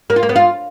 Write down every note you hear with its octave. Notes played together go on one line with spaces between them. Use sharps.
A#3
F4
A#3
B3
F4